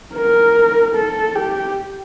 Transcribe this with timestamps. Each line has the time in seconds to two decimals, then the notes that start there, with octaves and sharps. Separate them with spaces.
0.14 A#4
0.95 A4
1.35 G4